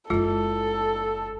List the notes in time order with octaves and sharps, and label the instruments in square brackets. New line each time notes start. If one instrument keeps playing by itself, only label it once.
[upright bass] F#1 E4 [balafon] G#3 F4 [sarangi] A4